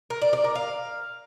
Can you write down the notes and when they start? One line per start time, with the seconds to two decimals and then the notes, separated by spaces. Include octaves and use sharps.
0.10 A#4
0.22 D5
0.33 D5
0.44 A#4
0.55 F5